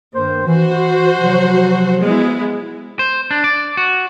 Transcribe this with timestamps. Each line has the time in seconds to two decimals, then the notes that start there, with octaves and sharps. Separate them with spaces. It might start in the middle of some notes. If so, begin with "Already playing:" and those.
0.14 G2 D#3 A#3 C5
0.47 E3 F#4 C5
1.17 C3 F3 F#3
2.02 G#3 B3 E4
2.99 C5
3.31 D4
3.44 D5
3.77 F#4